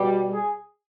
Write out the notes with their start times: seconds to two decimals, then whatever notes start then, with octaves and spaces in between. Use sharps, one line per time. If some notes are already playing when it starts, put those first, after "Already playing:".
Already playing: B2 G3
0.33 G#4